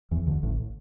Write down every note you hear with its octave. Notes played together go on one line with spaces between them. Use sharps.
E2 E3
D2 D3
A1 A2